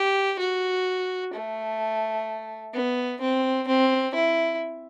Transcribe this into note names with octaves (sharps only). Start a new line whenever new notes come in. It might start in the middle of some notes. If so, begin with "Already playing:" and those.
Already playing: G4
F#4
A3
B3
C4
C4
E4